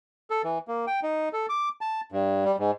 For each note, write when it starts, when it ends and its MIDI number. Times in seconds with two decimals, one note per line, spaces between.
0.30 0.42 69
0.44 0.58 52
0.68 0.86 58
0.87 1.00 79
1.03 1.29 63
1.33 1.46 69
1.49 1.69 86
1.81 2.01 81
2.12 2.44 43
2.44 2.56 55
2.59 2.71 44